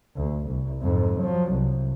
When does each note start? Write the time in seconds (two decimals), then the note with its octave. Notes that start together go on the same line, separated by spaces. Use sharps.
0.16 D2
0.47 C2
0.82 F2 G#2
1.20 F3 F#3
1.52 C2